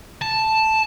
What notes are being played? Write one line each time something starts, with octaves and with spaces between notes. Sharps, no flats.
A5